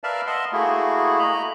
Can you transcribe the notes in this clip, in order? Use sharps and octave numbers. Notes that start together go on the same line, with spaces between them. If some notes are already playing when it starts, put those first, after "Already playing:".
A#4 B4 D5 E5 F5 A5
D#5 E5 F#5 A5 C6
A3 A#3 E4 F#4 G#4
D#5 A#5 B5